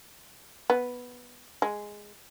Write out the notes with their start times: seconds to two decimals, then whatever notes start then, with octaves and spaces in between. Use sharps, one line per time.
0.70 B3
1.62 G#3